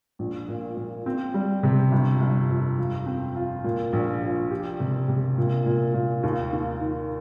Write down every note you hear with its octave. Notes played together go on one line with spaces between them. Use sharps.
A#1
A#2
A#2
C4
G3
C3
G1
G1
F2
F3
C4
F4
A#2
A#1
A#1
G4
C3
C3
A#2
A#2
A#2
D#2
D#2
D#3